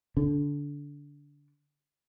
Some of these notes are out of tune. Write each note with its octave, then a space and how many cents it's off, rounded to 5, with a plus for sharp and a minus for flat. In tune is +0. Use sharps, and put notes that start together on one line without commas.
D3 -20